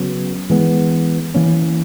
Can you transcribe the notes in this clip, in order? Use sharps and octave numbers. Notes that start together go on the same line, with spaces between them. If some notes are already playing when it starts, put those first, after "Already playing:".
Already playing: C#3 F#3 B3
E3 G#3 B3
E3 A#3 C#4